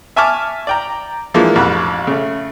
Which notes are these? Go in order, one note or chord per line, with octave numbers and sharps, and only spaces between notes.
E5 G#5 A5 C#6 D6 F6
D5 G5 A#5
E3 F3 G#3 A#3 D4
A1 F2 F#5 B5 F#6
C#3 A3